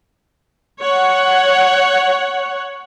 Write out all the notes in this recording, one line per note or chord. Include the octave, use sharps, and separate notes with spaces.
C#5 F#5